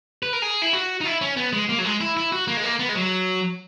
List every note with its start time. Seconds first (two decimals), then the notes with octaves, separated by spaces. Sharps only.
0.23 B4
0.33 A#4
0.42 G#4
0.62 E4
0.73 F#4
1.01 D#4
1.05 E4
1.21 C#4
1.37 B3
1.53 G#3
1.69 A#3
1.78 F#3
1.85 G#3
2.01 E4
2.17 E4
2.32 F#4
2.48 A#3
2.57 G#3
2.64 A#3
2.79 B3
2.89 G#3
2.95 F#3